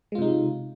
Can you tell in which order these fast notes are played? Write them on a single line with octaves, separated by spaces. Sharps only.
G#3 F4 C3 D#4